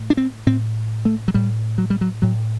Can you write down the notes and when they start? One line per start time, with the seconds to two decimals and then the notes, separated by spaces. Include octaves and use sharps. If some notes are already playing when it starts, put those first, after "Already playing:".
Already playing: A2
0.10 D4
0.17 C4
0.46 A2 C4
1.05 A3
1.28 F#3
1.34 A2 G3
1.78 F#3
1.90 G3
2.01 F#3
2.22 A2 F#3